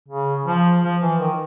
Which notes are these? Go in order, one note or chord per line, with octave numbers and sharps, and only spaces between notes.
C#3
F3
F3
E3
D#3